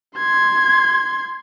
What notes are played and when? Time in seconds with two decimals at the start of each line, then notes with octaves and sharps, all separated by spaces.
0.17 C6 G#6